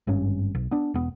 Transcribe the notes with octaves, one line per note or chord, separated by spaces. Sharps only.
G#1 G2 C#4
B1
B3 D4
E1 B3